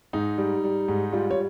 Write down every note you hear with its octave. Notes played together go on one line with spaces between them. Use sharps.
G#2 D#4
G3
G3
G#2
G3 F4
C#5